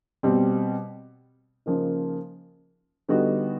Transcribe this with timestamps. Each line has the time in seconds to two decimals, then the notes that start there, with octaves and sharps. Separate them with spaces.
0.23 B2 G3 C4
1.66 C#3 F3 A#3 D#4
3.08 D3 G3 B3 D#4 F#4